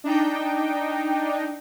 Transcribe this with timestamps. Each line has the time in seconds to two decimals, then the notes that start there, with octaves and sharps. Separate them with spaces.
0.04 D4 D#4 G5